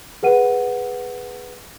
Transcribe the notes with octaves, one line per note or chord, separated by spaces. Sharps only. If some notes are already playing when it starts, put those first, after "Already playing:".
G#4 B4 F#5 D#7